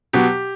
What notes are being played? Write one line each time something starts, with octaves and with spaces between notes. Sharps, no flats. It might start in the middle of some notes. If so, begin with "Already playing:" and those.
B2 F#3 B3 G4